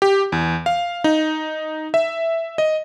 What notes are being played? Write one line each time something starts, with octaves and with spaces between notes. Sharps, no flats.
G4
E2
F5
D#4
E5
D#5